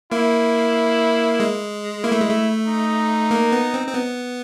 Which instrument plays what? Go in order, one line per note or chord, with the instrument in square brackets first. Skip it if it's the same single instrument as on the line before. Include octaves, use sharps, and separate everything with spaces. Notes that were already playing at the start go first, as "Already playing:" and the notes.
[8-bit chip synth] A#3 [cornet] E4
[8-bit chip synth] G#3
[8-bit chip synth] A#3 [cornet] E4
[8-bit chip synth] A3
G#3
A3
[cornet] D#4
[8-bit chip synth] A#3
B3
C4
C4
B3